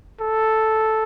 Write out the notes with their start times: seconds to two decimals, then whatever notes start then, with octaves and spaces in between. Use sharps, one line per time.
0.21 A4